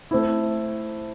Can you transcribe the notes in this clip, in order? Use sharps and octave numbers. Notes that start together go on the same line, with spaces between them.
A3 C4 E4